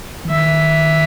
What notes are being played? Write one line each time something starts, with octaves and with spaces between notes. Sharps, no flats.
E3
D#3 E5